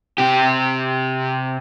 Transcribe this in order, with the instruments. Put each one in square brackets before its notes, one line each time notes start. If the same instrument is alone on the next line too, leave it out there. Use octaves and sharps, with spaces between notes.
[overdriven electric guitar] C3 G4